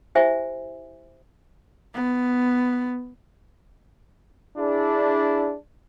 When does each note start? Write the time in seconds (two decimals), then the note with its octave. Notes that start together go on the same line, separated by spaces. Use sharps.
0.15 E4 G4 C5 E5 G#5
1.94 B3
4.58 D4 E4 G#4